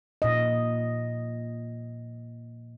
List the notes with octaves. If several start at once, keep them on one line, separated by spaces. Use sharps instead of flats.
A#2 D#5